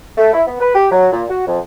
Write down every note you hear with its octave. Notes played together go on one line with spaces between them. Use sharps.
A3
E4
B3
B4
G4
F#3
A#2
F#4
F2